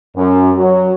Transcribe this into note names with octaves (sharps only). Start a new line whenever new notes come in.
F#2
F#3